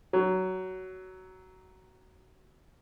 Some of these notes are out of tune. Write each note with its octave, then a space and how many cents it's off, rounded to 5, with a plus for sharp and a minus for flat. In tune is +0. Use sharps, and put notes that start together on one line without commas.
F#3 +15